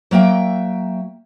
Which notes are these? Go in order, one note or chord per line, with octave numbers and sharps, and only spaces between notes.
F#3 A#3 E5 G5